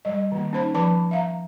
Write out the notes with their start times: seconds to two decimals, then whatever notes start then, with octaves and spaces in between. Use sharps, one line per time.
0.05 G3 D#5
0.32 D#3 A#3
0.53 C#4 D#4 C5 B5
0.74 F3 B4 A5 B5 D6
1.11 E5 F5 A#5